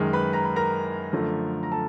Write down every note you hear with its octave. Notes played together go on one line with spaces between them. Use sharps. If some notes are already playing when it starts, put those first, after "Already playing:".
Already playing: F#2 D#3 G#3
B4 B5
A#5
B5
A#4 A#5
F#2 D3 F3 A3
A#5
A4 A5